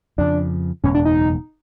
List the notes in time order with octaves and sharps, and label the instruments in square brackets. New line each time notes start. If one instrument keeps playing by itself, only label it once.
[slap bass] F2 C#3 F3 [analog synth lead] D4
[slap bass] F#1 E2 B2 G#3 [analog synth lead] C#4
[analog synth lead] D4
D#4